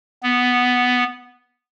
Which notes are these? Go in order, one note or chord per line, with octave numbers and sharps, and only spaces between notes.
B3